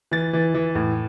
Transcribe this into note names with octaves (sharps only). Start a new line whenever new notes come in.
E3 A6
E3
E3
A2